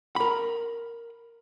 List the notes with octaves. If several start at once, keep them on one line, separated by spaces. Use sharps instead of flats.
A#4 B5